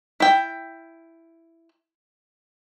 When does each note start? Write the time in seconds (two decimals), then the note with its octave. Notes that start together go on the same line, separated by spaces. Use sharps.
0.20 E4 G5